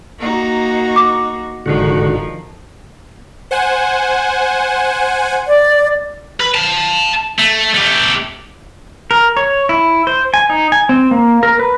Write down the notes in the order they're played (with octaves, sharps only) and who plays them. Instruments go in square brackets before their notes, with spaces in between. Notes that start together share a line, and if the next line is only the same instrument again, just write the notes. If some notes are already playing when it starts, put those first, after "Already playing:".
[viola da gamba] A#3 D#4 F#4
[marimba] D6
[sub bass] F1 [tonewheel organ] G#2 D3 F#4 [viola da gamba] D#3 F3
[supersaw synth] C5 F#5 G#5
[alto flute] D5
[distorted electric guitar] B4
F5 A5
A3
A3 G4
[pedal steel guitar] A#4
C#5
E4
C5
G#5
D#4
G#5
C4
A#3
A#4
B4